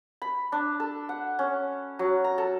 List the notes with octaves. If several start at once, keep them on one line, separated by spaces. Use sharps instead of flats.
B5
D4
A4
F#5
C#4
F#3
A#5
A4